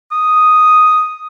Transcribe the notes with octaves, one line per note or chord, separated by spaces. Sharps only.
D#6